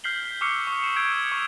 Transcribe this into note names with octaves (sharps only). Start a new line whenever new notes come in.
F6 G6 B6 C7 F#7 G7
C#6 D6 E6 F6 C7 C#7
C#6 D#6
C#7 E7
E6 G6 G#6 D7
C#6 C#7 F7